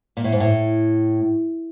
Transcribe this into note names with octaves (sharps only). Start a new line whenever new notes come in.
A#2
A2
G#2
A2